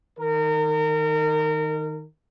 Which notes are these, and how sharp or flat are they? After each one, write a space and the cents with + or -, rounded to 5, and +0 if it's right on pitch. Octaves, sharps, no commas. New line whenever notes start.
D#3 +0 A#4 -30